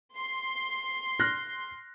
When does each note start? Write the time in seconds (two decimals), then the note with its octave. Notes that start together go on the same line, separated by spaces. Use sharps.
0.15 C6
1.19 F6 F#6 A#6